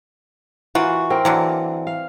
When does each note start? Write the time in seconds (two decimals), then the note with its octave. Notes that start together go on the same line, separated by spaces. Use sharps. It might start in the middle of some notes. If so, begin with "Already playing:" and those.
0.75 E3 A#3 F4 F#4
1.10 C4 A#4
1.25 D3 E3 F#3 A#3
1.87 F5